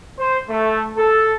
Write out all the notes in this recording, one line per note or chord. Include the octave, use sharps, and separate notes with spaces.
C5
A3
A4